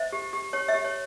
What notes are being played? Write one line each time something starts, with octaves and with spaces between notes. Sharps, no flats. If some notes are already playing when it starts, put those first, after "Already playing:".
Already playing: C5 E5
G4
G4
G4 C#5
E5
G4
C#5